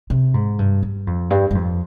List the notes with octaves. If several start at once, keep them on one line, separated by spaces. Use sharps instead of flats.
C3
G#2
G2
G2
F2
G2
G2
F2